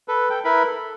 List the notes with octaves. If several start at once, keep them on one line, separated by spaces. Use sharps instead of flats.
A4 B4
A4 G5
E4 A#4 B4 B5
A4